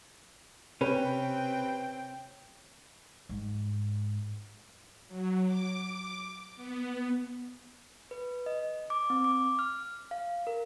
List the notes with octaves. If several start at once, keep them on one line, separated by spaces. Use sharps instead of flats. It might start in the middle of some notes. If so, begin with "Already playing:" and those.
C3 C4 C#4 G4 B4 G5
G#2
F#3
D6
B3
B4
D#5
D6
C4
D6
F6
F5
A#4